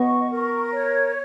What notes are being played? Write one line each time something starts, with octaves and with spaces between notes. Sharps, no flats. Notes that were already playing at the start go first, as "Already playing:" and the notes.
Already playing: B3 D#5 C#6
A#4
C#5